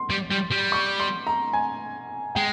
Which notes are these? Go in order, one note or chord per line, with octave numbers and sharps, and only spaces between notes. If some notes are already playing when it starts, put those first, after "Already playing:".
Already playing: C6
G3
G3
G3
C#6
C6
A#5
G#5
G#3 G5